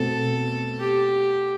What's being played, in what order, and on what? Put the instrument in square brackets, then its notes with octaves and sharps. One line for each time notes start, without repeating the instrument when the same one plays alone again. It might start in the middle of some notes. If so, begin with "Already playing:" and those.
Already playing: [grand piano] B2 A3 C4 [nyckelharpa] A4
[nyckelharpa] G4